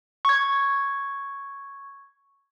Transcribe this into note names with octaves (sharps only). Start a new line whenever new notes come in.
C#6 G#6